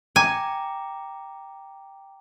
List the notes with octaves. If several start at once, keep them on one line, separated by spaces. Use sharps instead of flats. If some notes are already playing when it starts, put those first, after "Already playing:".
G5 G#5 A#5 D6